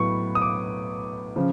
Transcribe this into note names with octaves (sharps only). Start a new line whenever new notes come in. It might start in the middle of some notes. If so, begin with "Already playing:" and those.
Already playing: A2 F#3 B3 C#6
D#6
D6
C#3 F3